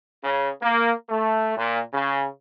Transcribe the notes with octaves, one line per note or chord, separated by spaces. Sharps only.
C#3
A#3
A3
A#2
C#3